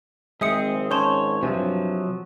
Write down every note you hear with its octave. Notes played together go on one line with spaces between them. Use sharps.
G#1 G#3 C4 G#4 E5 D#6 C#7
C#4 C#5 A5 C6 G6
G2 C3 F3 F#3 G#5